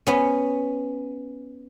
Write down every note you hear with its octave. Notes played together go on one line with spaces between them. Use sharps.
B3 C#4